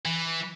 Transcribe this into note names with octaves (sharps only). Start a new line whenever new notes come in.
E3